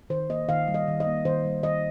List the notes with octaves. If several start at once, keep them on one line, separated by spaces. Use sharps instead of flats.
D#3 C5
A#3 D#5
D#3 F5
G3
D#5
D#3
D#5
A#3
D#3 C5
G3
D#3 D#5